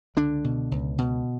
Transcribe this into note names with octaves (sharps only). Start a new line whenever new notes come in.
C#2 D3 D4
B2
C#2
B2